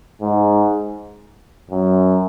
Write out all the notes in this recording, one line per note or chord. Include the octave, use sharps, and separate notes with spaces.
G#2
F#2